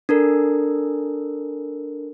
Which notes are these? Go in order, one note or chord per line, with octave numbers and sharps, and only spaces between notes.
D4 A4 A#4